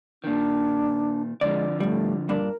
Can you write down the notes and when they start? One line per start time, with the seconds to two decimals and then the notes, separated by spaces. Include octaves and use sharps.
0.24 A#2 D#3 D4
1.41 D3 F3 G#3 D5
1.80 A2 G3 A3
2.29 G2 A#2 D4 A#4